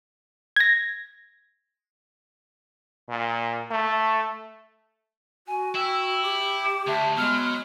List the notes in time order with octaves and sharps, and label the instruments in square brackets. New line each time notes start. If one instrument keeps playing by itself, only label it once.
[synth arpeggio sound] G#6 A#6
[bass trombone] A#2
A3
[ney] F#4 [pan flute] G#5
[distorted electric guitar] E4 [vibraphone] G5 [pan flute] E6
[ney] G4 [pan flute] D6
[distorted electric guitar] D2 [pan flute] E5 [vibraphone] A5
[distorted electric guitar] F#3 [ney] G#3 [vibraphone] B3 [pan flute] F6